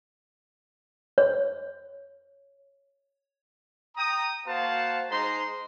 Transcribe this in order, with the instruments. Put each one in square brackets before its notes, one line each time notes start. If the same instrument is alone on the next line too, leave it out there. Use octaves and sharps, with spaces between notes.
[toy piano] C#5
[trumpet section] G5 A#5 D#6
A#3 F#4 C5 F5 F#5 A5
G#3 D#4 C5 A#5 C6